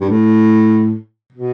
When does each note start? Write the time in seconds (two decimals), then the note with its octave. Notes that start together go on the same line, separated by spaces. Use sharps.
0.01 G2
0.10 A2
1.32 B2